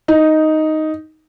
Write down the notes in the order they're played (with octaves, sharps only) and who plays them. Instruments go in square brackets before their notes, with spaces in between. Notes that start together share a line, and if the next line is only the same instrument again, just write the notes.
[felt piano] D#4